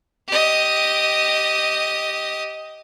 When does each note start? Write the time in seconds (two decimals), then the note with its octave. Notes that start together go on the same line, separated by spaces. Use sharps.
0.28 G4 D#5